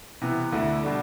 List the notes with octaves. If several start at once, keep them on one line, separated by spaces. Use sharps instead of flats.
C3 E3 B3
D2 D3 A3 E4 A4
B2 G3 D4 A4